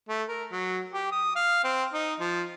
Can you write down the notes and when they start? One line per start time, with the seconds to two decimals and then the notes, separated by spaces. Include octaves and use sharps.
0.09 A3
0.29 A#4
0.52 F#3
0.94 G4
1.12 D#6
1.36 F5
1.64 C4
1.94 D#4
2.20 F3